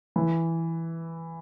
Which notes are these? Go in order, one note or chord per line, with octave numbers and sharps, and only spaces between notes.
E3